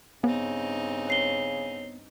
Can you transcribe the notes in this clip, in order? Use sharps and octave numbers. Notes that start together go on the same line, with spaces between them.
G2 C#3 B3 C4 D#4
C#5 C7 G7